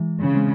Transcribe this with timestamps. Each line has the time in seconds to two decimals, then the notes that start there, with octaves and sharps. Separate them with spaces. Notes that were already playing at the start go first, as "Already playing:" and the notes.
Already playing: E3 G#3
0.20 C#3
0.35 G#3 C4